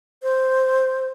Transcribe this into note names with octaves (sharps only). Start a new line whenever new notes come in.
C5